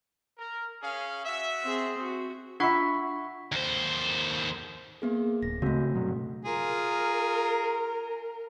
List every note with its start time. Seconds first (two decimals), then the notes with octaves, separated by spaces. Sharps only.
0.38 A#4
0.82 C#4 G#4 F5
1.25 F#4 E5
1.65 C4 G#4
2.01 F#4
2.60 D4 F4 E5 F#5 B5 C#6
3.52 D#2 C5
5.02 A#3 B3 G#4
5.43 D1 A#6
5.62 C#3 G#3 A3 C4 F#4
5.95 G2 B2 F#3
6.45 F4 G#4 A#4